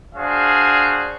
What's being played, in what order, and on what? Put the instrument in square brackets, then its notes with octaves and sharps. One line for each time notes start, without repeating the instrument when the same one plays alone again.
[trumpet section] D4 F#4 G#4 C5 F5